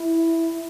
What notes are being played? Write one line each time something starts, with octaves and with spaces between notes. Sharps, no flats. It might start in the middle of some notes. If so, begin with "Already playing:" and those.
Already playing: E4